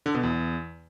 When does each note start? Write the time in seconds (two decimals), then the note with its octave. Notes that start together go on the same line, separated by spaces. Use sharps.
0.06 D3
0.14 B2
0.23 E2